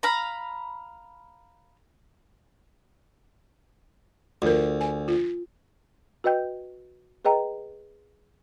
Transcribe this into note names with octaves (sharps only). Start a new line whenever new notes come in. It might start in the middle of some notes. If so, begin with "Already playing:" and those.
F5 A#5 B5
D2 F4 A#4
G#5
F4
F#4 B4 D#5 G5 G6
G#4 B4 D#5 G5 A#5